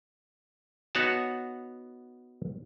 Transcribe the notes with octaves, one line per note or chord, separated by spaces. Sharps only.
B3 D#4 F#4 C#5 F#5 A5